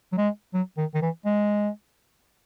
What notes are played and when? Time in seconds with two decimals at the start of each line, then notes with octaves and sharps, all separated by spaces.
0.13 F#3
0.18 G#3
0.54 F#3
0.78 D#3
0.95 D#3
1.02 E3
1.26 G#3